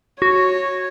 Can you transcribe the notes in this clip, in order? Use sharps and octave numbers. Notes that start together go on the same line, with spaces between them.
F#4 C#5